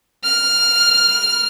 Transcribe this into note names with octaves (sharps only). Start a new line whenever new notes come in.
F6